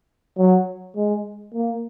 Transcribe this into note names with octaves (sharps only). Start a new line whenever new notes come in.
F#3
G#3
A#3